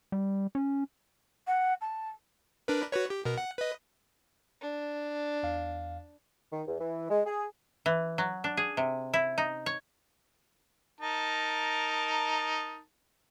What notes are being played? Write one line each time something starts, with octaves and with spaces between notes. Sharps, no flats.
G3
C#4
F#5
A5
D4 A#4 B4
F#4 B4 C#5
G4
B2 A#4
F#5
B4 D#5
D4
E2 F5
D#3
E2
E3
G#3
G#4
E3
F#3
D4
G#4
C3
E4
D#4
C#5
D#4 A#4 A5